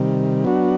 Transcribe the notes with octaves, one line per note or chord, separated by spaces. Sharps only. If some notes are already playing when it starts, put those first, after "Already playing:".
Already playing: C3 D#3 G3
F#3 B3 D4 F#4